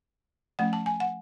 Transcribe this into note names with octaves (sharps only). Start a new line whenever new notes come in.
F3 A3 C#4 F#5
A5
G#5
F#5